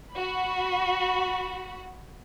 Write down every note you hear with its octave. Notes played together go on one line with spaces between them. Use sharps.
F#4 B5